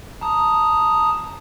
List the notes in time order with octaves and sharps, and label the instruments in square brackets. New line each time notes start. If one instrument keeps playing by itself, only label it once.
[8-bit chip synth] A5 A#5 D#6